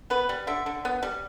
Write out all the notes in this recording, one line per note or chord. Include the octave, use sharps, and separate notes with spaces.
B3 B4
G3
D3 E5
D3
B3
G3